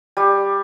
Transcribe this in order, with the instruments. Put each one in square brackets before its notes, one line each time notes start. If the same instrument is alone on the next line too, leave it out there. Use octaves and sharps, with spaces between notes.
[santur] G3